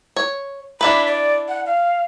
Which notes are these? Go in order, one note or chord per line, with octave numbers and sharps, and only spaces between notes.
C#5
D4 E4 B4 B5
D5
F#5
F5